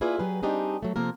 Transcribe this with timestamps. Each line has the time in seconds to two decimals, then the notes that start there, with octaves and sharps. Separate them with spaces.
0.01 A#3 E4 F4 G#4 B4 D5
0.19 F#3 G4 G#4 B4
0.43 G3 C4 D4 D#4 G4 G#4
0.83 F#3 A3
0.96 C3 F3 A#3 A4 A#4